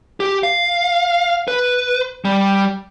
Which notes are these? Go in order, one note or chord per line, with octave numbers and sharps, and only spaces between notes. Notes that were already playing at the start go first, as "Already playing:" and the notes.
G4
F5
B4
G3